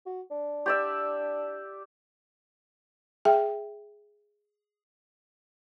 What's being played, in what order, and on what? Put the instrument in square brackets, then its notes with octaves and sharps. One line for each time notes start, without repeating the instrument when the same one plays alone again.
[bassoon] F#4
D4
[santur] G4 D5 E5
[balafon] G#4 E5 G5